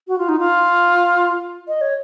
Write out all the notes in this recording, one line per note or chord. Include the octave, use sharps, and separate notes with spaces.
F#4
F4
D#4
F4
D#5
C#5